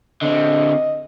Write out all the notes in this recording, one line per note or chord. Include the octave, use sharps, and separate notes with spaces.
D3 C4 D#5